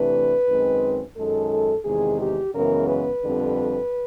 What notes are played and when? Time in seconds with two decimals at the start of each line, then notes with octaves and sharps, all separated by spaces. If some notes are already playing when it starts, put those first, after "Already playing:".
Already playing: C3 E3 A3 D4 B4
0.47 F#2 D#3 G#3 C4
1.16 F#2 D#3 G#3 A4
1.85 E2 C3 D#3 G#3 G#4
2.19 G4
2.54 F#2 C#3 E3 G#3 B3 A#4
2.88 B4
3.23 F2 D3 G3 C4